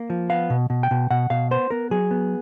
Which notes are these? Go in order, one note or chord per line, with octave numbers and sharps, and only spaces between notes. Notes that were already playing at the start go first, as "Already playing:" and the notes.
Already playing: A#3
F3
B3 F5
B2
B2
G5
B2
B2 F#5
B2 F5
B3 C5
B3 A#4
F#3 G#4
B3